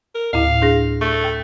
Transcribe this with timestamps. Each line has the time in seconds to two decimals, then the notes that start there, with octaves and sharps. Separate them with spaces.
0.15 A#4
0.33 D2 A2 E4 F5
0.62 D4 G#4 A#6
1.01 A3 C#6
1.24 G5